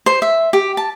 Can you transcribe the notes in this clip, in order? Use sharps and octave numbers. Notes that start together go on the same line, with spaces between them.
C5
E5
G4
A5